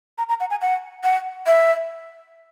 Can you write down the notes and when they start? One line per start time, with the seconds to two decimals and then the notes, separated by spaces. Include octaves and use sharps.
0.18 A#5
0.29 A#5
0.40 F#5
0.51 G#5
0.62 F#5
1.04 F#5
1.46 E5